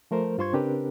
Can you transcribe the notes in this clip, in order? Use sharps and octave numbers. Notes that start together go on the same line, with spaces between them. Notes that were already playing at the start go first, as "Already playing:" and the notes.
F3 A3 A#4 C5
G2 F4 C5 C6 C#6 G#6
C#3 C4 D4 G4 A#4 B4